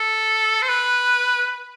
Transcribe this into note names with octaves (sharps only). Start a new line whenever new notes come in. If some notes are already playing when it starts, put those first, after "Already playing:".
Already playing: A4
C5
B4